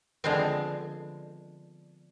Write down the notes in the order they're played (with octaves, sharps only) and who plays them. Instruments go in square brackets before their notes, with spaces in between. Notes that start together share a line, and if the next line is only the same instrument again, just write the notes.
[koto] D3 F3 G#3 B3 C4